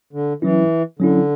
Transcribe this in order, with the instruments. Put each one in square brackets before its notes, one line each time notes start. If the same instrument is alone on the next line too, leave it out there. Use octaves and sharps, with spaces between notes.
[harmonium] D3
[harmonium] E3 [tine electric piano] F#3 C#4 E4
[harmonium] D3 [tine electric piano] F#3 C#4 E4